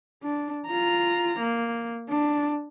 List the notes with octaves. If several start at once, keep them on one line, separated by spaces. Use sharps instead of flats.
D4
F4 A#5
A#3
D4